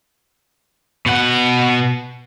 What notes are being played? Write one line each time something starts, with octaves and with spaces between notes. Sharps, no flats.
B2 F#5